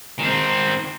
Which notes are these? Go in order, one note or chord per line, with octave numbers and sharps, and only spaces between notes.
D#3 C4